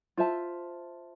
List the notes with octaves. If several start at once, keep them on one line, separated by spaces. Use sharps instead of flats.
F4 C5 E5 A5